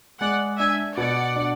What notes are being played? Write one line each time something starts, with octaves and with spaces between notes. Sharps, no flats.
G#3 D5 F#5
D4 E5 G#5
B2 D5 F#5
D4